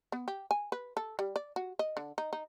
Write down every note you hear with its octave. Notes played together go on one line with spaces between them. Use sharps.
B3
G4
G#5
B4
A4
G3
D5
F#4
D#5
D3
D#4
D#4